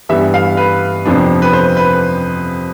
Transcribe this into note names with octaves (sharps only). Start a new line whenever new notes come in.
G2 E3 G3 B3 E5
F5
B4
F2 C3 F3 B3 D4
B4
C5
B4